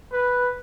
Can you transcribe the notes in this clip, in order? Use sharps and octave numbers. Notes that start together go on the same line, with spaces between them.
B4